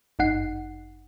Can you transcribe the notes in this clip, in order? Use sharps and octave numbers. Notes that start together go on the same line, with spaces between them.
G1 F#2 D#4 F#5 C7